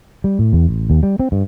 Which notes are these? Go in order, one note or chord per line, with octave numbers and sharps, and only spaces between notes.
G3
A2
E2
A1
D#2
G3
C4
G2